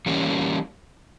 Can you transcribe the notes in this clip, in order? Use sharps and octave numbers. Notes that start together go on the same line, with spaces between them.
E3 G3 A#3 C#4